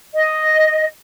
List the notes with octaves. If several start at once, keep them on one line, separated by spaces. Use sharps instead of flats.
D#5